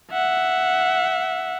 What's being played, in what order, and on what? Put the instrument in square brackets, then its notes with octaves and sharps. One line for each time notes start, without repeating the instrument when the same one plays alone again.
[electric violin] E5 F#5